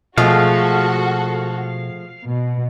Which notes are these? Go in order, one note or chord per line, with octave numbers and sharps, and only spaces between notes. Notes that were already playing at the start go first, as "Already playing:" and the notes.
B2 F3 G#3 A3 F#4 A4 F5
B2